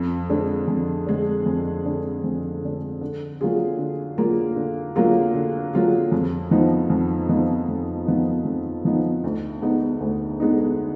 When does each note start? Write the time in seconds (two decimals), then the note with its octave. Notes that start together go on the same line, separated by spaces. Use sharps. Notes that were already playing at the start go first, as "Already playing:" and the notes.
Already playing: F2
0.29 D3 G#3 D4
0.68 F2
1.07 D3 G#3 D4
1.46 F2
1.85 D3 G#3 D4
2.24 F2
2.62 D3 G#3 D4
3.01 D3
3.41 F#3 A#3 F4 G#4
3.79 D3
4.18 F#3 A#3 F4 G#4
4.56 D3
4.95 F#3 A#3 F4 G#4
5.34 D3
5.73 F#3 A#3 F4 G#4
6.12 F2
6.51 F3 B3 D#4
6.90 F2
7.29 F3 B3 D#4
7.68 F2
8.06 F3 B3 D#4
8.45 F2
8.85 F3 B3 D#4
9.24 D2
9.62 D3 G#3 B3 D#4
10.00 D2
10.40 D3 G#3 B3 D#4